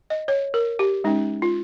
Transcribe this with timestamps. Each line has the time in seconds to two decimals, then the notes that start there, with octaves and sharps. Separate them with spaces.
0.10 D#5
0.28 C#5
0.54 A#4
0.79 G4
1.04 G#3 C#4 D#4
1.42 F4